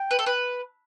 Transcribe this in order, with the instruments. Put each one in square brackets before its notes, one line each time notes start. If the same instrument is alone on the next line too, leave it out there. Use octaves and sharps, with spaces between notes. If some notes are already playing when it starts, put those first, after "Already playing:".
Already playing: [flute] G5
[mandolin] B4
A4
B4